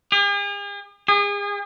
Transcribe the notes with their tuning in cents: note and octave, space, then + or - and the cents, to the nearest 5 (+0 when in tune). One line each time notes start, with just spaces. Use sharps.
G#4 -45
G#4 -35